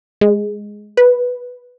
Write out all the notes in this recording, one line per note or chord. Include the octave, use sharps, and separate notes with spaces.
G#3
B4